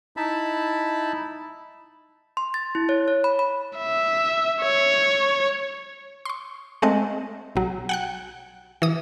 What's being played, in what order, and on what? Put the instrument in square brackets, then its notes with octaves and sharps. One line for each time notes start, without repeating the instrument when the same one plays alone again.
[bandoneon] D#4 E4 E5 A5 B5
[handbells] C6
A6
E4
C#5
C#5
B5
B5
[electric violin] E5
C#5
[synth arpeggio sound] C6 C#6
G#3 A3 C4 D#5
B1 F#3
F#5 G5 F#6
E3 D#6